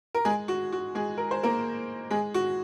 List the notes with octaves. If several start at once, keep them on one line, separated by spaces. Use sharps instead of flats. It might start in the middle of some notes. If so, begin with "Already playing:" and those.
A#4
G#3 G#4
F#4
F#4
G#3 G#4
A#4
C5
A#3 A#4
G#3 G#4
F#4